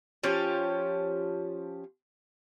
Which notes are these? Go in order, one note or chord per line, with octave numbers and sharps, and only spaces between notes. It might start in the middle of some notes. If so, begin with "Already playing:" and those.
F3 C#4 G4 C#5